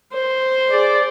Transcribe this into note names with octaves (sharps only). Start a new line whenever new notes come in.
C5
G#4 D5